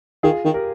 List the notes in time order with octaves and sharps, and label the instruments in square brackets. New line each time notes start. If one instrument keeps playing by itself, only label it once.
[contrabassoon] D#3 [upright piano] F4 G#4
[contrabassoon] D#3
[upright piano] G4 A#4